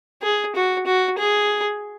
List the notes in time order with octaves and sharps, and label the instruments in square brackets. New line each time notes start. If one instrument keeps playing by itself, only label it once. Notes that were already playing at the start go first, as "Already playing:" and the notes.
[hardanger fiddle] G#4
F#4
F#4
G#4